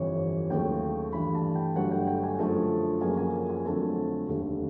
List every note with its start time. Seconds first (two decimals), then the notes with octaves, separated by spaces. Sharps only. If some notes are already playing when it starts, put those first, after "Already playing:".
Already playing: G1 F2 C3 E3 C#5
0.50 D#2 C#3 F#3 A3 G5
1.13 G2 E3 A3 D4 B5
1.35 A5
1.55 G5
1.76 G1 G2 D3 F#3 A3 F#5
1.91 G5
2.07 G5
2.23 G#5
2.39 F#2 D3 F3 A3 A5
3.01 F#2 C#3 F3 A#3 C#4 G#5
3.17 G#5
3.34 G#5
3.50 G#5
3.65 F2 D3 F#3 A3 C4 A5
4.28 F1 D#2 D3 G3